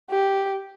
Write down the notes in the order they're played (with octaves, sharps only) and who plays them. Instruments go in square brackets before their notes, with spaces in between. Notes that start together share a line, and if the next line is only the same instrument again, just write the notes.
[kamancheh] G4